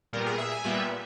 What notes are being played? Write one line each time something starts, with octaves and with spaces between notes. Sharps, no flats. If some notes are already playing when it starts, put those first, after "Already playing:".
A#2 G3 B3 A#4
G#4
E5
G#5
A#2 G3 B3 E5